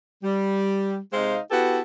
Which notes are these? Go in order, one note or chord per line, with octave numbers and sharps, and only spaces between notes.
G3
C3 G#3 D#4 C5 F5
B3 E4 F#4 G4 A4 B4